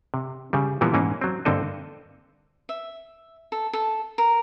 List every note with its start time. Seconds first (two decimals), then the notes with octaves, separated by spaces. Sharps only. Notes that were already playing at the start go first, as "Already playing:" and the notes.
0.14 C3
0.53 C#3 G3
0.81 A#2 E3 F3 G3 A#3 B3
0.94 G#2 E3 A#3 C#4
1.21 F#3 C4
1.45 G2 D3 A#3 C4 A4 D#5
2.69 E5
3.52 A4
3.73 A4
4.18 A#4